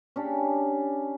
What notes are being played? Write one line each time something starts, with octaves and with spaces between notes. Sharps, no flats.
C#4 D4 G4